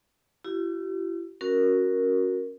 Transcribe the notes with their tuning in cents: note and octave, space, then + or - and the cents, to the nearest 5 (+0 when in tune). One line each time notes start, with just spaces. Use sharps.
E4 +40 G4 -40
C#4 +0 F#4 +0 A#4 +0